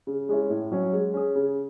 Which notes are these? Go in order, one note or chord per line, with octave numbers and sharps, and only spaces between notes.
C#3
G#3 C#4 E4
A2
F#3 C#4
G#3
C#4 G#4
C#3